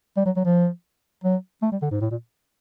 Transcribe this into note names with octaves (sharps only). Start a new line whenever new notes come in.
G3
F#3
F#3
F3
F#3
A3
G3
D3
G#2
A2
A#2